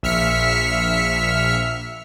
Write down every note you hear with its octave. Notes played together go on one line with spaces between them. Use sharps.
A#1 E5 F6 B6 C#7